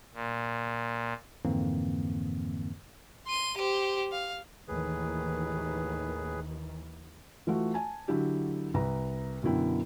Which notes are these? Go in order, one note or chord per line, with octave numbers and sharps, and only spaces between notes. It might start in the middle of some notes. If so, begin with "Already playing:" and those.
A#2
F2 G#2 D3 E3 A#3 C4
C6 D#7
G4 C5
F5
D#2 A2 D#3 E3 G#4 B4
E3 A3 F4 F#4
G#5 A5
D3 F#3 E4 G4
C2 B4 A#5
F#2 B2 D3 E4 G5